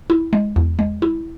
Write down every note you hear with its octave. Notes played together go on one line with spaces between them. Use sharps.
E4
G#3
E2
G#3
E4